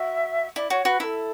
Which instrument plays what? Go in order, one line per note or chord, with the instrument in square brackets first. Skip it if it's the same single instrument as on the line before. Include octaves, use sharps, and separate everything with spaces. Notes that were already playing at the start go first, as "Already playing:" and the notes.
Already playing: [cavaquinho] F#4 [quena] E5
[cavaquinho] E4 [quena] D5
[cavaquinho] F#4 [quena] C#5
[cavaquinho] F#4 [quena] B4
[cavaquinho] E4 [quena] A4 B4